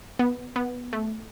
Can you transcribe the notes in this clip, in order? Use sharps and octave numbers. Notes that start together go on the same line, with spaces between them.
B3
B3
A3